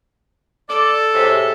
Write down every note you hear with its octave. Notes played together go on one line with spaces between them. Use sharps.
A4 D5
A2 C3 G#3